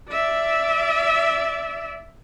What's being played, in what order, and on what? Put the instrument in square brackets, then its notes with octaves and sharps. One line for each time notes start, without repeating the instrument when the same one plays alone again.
[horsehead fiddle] D5 E5